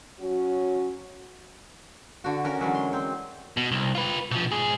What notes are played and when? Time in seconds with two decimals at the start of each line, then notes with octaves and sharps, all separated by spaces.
0.20 F#3 C#4 F#4
2.24 D3 F#4
2.45 C#4 F#4 A#4
2.59 D3 E3 F#3 G#3
2.74 C6
2.93 C4
3.57 B2
3.72 C2
3.95 F4 B4
4.31 B2 F3
4.51 G#2 G#4